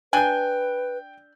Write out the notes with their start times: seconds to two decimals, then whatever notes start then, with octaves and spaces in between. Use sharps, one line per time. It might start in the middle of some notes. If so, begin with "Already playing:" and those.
0.13 D4 B4 G5 G#5 G6